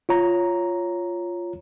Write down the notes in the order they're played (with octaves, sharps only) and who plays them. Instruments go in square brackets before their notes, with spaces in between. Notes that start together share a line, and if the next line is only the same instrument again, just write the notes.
[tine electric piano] F4 C#5 A#5